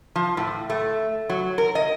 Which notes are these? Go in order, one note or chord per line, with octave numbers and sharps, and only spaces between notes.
F3
A2
A3
F#3
A#4
D#5